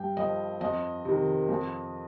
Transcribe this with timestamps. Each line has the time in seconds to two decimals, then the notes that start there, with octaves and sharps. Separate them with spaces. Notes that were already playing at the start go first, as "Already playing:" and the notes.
Already playing: G2 G5
0.17 F3 D#5
0.61 F2 D#5
1.05 C3 D#3
1.49 F2